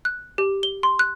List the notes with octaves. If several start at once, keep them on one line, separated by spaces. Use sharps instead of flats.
F#6
G4
G7
C6
F#6